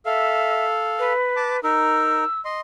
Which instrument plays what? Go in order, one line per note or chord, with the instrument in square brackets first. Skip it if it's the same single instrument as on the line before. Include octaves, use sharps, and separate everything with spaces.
[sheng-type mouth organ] A4 F5 [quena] E5
[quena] B4
[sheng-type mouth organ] A5 D6
[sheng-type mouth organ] D#4 A#4 [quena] E6
[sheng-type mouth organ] D#5 C6